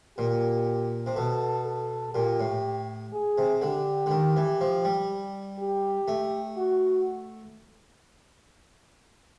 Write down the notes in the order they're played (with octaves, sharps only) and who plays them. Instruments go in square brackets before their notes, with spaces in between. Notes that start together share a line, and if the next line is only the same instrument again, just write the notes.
[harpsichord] A#2 [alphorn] G4
[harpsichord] C3
[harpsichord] B2 [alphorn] A4
[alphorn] A4
[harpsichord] A#2 [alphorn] G4
[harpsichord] A2
[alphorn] G#4
[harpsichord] C3
[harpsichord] D3 [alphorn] G4
[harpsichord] D3
D#3
E3
F3
G3
[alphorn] G4
[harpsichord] A3
[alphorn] F#4